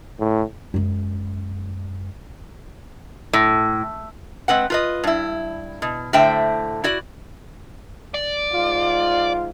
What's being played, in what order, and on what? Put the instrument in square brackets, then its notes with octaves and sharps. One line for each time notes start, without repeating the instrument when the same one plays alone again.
[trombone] A2
[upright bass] F#2 G#3
[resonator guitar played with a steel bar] A2
G#3 C4 B4 F#5
F4 B4 D#5
G2 E4
B2
A2 D3 A3 C5 E5 G5
E4 F#4 D5
[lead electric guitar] D5
[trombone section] G#2 F4